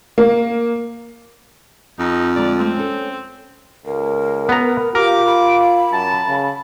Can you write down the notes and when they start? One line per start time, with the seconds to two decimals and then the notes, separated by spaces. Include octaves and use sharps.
0.18 A#3
1.99 F2 D#4
2.36 D3 G#3 D5 A#5
2.59 G#3 A3 C4
2.75 C#4 A4
3.86 C#2 A#4
4.49 B3 A#5
4.95 F4 G4 A#4 D6
5.26 B5
5.92 F#2 A5
6.28 C#3